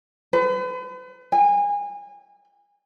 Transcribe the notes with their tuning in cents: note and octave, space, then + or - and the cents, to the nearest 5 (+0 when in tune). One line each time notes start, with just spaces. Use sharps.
B4 +40
G#5 -30